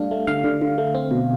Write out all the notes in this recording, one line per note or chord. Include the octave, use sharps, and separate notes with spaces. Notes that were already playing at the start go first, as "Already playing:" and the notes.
Already playing: G3 A3 D4 F5
A3
D3 F5
D3
D3
A3
C4
B2